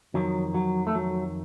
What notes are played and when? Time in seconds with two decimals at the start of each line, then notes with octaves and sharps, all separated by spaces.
0.14 F2 D#3 F#3
0.55 F#3
0.87 A3
0.95 F#3